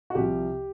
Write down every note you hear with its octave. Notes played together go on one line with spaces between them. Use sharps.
F#4
C2 C3 F3 G4